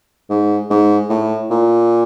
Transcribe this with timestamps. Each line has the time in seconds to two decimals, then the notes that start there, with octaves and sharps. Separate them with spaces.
0.30 G#2
0.70 G#2
1.09 A2
1.50 A#2